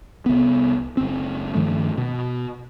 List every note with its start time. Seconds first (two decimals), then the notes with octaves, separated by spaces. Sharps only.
0.26 C2 B3
0.97 F#1 C4
1.55 G2 D#3 F3 A3
1.98 B2